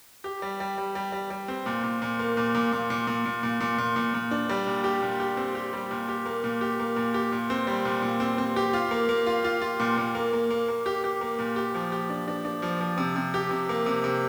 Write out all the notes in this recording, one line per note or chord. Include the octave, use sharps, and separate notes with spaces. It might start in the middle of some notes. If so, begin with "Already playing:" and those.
G4
G3
G3
G3
G3
G3
G3
C4
A#2
A#2
A#2
A#3
A#2
A#2
A#2
A#2
A#2
A#2
A#2
A#2
A#2
A#2
A#2
D4
G3
A#2
G4
A#2
G4
C4
G4
G3
A#2
G4
A#3
A#2
G4
A#3
A#2
G4
A#2
C4
G3
A#2
A#2
C4
C4
G4
F4
A#3
A#3
F4
F4
F4
A#2
A#2
A#3
A#3
A#3
A#3
G4
G4
A#3
A#2
G4
F3
G4
D4
D4
D4
F3
F3
C3
C3
G4
C3
A#3
C3
C3